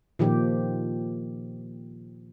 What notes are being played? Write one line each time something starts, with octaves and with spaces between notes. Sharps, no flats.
A#2 D#3 F3 G4